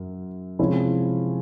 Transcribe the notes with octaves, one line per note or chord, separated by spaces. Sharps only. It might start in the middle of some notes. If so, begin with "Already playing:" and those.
Already playing: F#2
C3 F3 G#3 C#4 E4